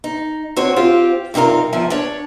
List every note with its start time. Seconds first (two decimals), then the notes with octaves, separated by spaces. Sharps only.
0.04 D#4
0.57 C4 F#4 C#5
0.76 C4 F4 G4
1.34 G2 C3 D#4 F4 A#4
1.73 E2 F3 E4 G#5
1.90 D4 C#5